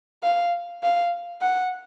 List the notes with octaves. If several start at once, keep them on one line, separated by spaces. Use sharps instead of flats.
F5
F5
F#5